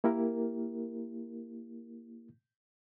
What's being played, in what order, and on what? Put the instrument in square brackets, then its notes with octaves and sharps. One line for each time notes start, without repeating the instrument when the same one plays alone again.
[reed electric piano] A#3 E4 G4 A#4